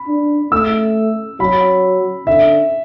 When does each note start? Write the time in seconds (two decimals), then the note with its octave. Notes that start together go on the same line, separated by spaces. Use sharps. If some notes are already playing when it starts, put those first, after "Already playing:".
Already playing: B5
0.08 D4
0.52 A3 E6
1.40 F#3 B5
2.27 D3 E5